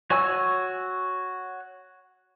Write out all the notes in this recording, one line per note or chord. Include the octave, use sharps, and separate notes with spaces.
F#4 C#5 G#5 C#6 E6